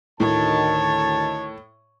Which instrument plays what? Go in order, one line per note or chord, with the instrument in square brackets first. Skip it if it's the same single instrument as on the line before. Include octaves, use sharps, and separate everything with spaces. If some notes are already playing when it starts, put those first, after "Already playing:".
[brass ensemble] D2 D#3 A5 [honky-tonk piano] A2 [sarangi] C#5